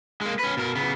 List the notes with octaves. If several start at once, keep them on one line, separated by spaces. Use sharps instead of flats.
G#3 A#3
C#4 B4
B2 A#4
C#3 B3